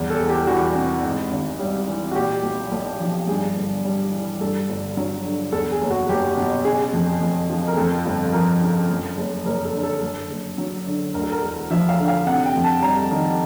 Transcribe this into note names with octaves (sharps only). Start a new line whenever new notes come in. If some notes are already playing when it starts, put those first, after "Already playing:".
Already playing: E2 G3
A4
E1
G4
E3 F#4
C3
G#2
G#1
G3
E3
F#4
A#2 G4
B1
B1
F3
G2 G#4
G1
G3
E3
G2 A4
G1
F#3
D3
E2 A4
G#4
F#1
F#4
F#1 G4
B2
C#3 G#4
F2
F2
F3
A#4
F2 A4
G1
F3 A#4
C#3
F#2
F#1
F#1 A#4
A4
D3
A4
F#2
F#1
F#3
D3
D2 A#4
A4
A#4
E1
F3 E5
F5
D3
F5
C3 F#5
G5
F2
A5
G3 A#5
D#3